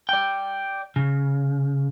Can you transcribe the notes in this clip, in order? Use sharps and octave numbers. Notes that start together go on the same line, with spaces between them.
D5 G5
C#3